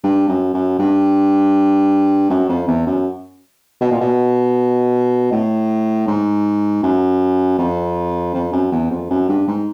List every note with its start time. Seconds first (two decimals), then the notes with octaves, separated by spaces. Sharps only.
0.04 G2
0.28 F#2
0.54 F#2
0.79 G2
2.30 F#2
2.49 F2
2.67 E2
2.87 F#2
3.81 B2
3.91 A#2
4.00 B2
5.32 A2
6.07 G#2
6.83 F#2
7.58 F2
8.34 F2
8.52 F#2
8.72 E2
8.91 F2
9.10 F#2
9.29 G2
9.48 G#2